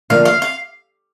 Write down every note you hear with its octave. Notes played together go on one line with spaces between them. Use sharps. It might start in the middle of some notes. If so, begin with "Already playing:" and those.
D3 F3 A#3 F5
F5
F5